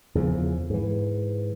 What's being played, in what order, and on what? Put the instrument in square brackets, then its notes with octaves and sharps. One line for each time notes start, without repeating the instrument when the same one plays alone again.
[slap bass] E2 C#3 E3 F3
G#2 E3